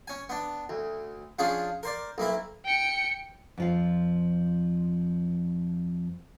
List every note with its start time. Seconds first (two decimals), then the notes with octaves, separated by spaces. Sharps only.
0.07 C#4 G#5
0.29 B3 D4
0.69 D2
1.39 F3 C#4 D4 F4 G#4
1.83 A#4 C5 D5
2.18 B1 A#3 E4 B5
2.65 G5 C#7
3.57 F2 F3 F5